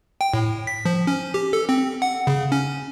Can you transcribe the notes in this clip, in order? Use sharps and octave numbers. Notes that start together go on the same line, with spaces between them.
G5
A2
B6
F3
C#4
G4
A4
C4
F#5
C#3
C#4